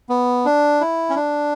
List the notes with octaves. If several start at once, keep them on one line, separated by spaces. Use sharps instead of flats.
B3
D4
E4
C#4
D4